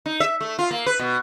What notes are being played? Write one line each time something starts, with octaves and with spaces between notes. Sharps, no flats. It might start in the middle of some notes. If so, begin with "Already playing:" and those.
D#4
E5
A3
F4
A#3
B4
B2